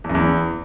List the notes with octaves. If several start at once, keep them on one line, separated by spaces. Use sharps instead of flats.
E2
F#2
E2